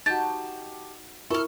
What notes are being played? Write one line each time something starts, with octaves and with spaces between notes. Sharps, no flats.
D#4 F#4 G4 A5 G6 A6
E4 A4 A#4 C#6 F6